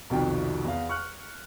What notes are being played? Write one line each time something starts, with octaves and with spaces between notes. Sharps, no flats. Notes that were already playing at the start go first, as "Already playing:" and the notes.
C2 F2 B2 D#3 G5
E2 F5
C#6 F6 F#6